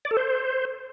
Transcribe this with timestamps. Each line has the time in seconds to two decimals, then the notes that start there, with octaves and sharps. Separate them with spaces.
0.05 D5
0.11 A4
0.17 C5